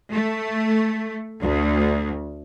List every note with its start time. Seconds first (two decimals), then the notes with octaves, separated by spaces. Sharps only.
0.11 A3
1.42 D2